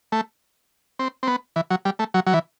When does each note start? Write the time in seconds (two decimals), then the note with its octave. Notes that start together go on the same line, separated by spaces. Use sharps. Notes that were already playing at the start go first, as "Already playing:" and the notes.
0.12 A3
0.99 C4
1.23 C4
1.27 B3
1.56 E3
1.70 F#3
1.85 G3
1.99 A3
2.14 F#3
2.27 F#3
2.33 E3